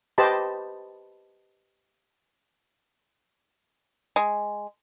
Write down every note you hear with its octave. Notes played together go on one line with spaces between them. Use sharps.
G4 B4 C5 D#5 A5 B5
G#3